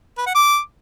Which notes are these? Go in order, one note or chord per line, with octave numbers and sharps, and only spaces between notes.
B4
F#5
D6